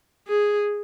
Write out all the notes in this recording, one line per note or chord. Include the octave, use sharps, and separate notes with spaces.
G#4